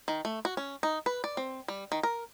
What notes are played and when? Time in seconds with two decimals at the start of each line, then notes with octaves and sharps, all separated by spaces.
0.08 D#3
0.25 A3
0.45 F#4
0.57 C#4
0.83 D#4
1.06 B4
1.24 D5
1.37 C4
1.68 G3
1.92 D#3
2.03 A#4